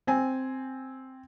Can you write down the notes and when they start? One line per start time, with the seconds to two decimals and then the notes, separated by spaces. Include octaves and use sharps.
0.07 C4 G#5